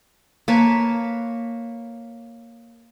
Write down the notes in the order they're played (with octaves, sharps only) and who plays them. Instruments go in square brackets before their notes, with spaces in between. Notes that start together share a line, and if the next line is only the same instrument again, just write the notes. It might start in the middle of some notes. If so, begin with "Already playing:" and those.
[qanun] A#3 B4 C#5 A5